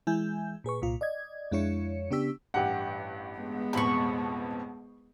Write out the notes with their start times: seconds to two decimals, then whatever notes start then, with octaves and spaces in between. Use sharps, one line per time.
0.07 E3 G#3 E4 G#5 G6
0.64 A#2 G#4 B4 C#6
0.82 C2 A#2 F4
1.01 D5 D#5 G#6
1.52 F2 G#3 D4 E4 C#5 C#7
2.11 C#3 B3 D4 G4 E6 B6
2.54 A1 G2 G4 F#5
3.39 G#3 B3
3.73 A1 F2 B2 B5 C#6